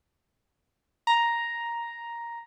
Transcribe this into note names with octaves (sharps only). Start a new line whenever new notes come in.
A#5